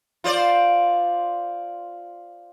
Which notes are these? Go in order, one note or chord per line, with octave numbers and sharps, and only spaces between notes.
F4 C5 D5